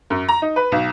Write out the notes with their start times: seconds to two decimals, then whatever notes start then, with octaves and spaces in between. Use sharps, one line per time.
0.10 F#2
0.28 A#5
0.42 D#4
0.56 B4
0.72 B1